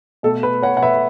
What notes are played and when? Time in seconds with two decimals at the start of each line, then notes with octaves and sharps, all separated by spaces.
0.23 B2 A3 A4
0.43 B4
0.62 C#5 F#5
0.77 F#5
0.83 B4 E5